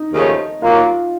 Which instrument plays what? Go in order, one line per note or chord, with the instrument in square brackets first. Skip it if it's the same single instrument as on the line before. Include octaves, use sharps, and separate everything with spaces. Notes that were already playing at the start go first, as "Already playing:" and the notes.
Already playing: [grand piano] D#4
[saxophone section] D#2 C#3 F3 A3 C#4
[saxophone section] D#2 D#3 F#3 A#3 [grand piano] F4